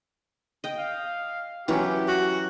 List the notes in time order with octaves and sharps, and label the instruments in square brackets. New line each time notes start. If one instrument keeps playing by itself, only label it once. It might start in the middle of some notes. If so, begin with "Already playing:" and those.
[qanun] D#5 G5
[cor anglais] F5
[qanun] E3 F#3 C#4 [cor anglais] G4
[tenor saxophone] F#4